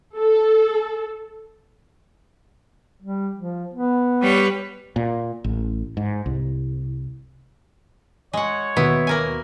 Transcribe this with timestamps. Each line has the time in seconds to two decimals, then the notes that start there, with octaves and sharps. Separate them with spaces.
0.18 A4
3.02 G3
3.37 F3
3.74 B3
4.21 G3 B4 C#5
4.96 A#2
5.44 A1
5.97 G#2
6.26 C2
8.33 G#3 C#5 F#5
8.76 D#2 B2 B3 E4
9.07 A#3 A#4 G#5